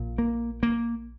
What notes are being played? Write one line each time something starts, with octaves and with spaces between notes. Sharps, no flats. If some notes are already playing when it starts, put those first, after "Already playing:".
Already playing: A#1 A#2
A#3
A#3